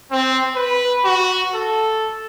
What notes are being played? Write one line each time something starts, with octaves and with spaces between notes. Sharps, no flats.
C4
B4
F#4
A4